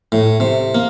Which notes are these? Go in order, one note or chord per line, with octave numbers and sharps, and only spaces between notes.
A2
C3
A#3